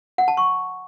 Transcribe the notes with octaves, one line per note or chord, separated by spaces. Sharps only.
F#5
A5
C#6